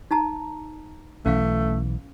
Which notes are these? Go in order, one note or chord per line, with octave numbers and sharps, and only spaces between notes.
D#4 A5 A#5
B1 E3 A3 C#4 F5